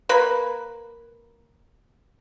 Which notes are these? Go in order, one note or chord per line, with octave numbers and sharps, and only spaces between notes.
A#3 B4 B5